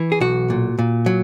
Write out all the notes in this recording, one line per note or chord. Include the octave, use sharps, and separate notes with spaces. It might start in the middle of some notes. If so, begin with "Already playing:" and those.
Already playing: E3
G#4
B1 F#4
A#2
A#2
F#3